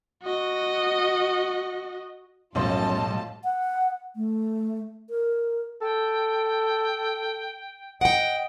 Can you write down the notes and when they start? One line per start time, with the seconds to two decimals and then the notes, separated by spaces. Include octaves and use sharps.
0.23 F#4 D#5
2.55 B1 F#2 A2 F3 G3 F4 A5 C6
3.44 F#5
4.16 A3
5.10 A#4
5.82 A4 G5
8.01 D#5 F#5 G5 D7